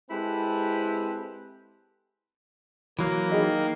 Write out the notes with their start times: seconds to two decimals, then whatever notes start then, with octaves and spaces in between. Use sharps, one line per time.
0.10 G#3 C4 E4 G4 A4 B4
2.99 E3 F#3 A#3
3.30 D#3 G#4 D#5 B5